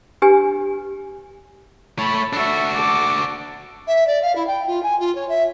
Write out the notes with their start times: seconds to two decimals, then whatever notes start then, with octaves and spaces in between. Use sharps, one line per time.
0.22 D4 G4 B4 G#5
1.99 A3 C#5 A5 B5
2.33 D4 F#4 A4 E5
2.75 A4 D6
3.87 E5
4.07 D5
4.22 F5
4.35 E4
4.47 G5
4.67 F4
4.83 G#5
4.99 F4
5.15 C#5
5.28 E5